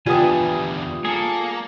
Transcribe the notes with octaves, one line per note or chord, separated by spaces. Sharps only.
E2 D3 G3 B3 D4 F4 G#5 D#6
A#3 G#4 A4